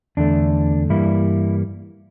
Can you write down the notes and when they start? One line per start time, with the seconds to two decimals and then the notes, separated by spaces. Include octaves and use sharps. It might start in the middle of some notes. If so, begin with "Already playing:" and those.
0.17 E2 D3 A3 D4
0.90 G2 E3 G3 A#3 E4